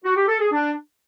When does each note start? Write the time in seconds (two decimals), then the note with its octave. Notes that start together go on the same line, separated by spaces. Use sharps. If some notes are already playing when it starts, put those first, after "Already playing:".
0.04 F#4
0.16 G4
0.28 A4
0.40 G#4
0.51 D4